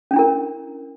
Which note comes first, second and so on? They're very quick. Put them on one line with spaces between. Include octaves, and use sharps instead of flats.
C#4 D4 E4 A#4